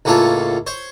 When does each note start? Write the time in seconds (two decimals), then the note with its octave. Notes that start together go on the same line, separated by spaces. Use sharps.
0.05 C#2 A2 A#3 C#4 F4 A4
0.67 C5 C#5